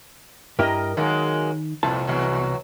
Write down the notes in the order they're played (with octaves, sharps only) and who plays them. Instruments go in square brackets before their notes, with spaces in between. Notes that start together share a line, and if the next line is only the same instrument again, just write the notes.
[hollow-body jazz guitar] G2 E4 G4 [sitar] A#4 D#5
[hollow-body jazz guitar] D#3 [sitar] F#3 G#3 A#3
[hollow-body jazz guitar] C2 E4 A5 [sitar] F2 A#2
[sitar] E2 B2 F#3